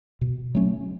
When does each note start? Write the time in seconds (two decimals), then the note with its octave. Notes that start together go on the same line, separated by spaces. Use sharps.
0.21 B2
0.55 F#3 A3 C#4